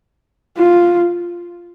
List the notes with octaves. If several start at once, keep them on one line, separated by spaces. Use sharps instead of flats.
F4